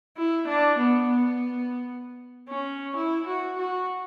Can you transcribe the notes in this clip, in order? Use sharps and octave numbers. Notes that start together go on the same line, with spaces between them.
E4
D4
B3
B3
C#4
E4
F#4
F#4